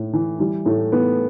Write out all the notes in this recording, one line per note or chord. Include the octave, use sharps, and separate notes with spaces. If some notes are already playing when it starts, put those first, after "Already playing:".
Already playing: A2
E3
E3 G3
A2 A3
E3 B3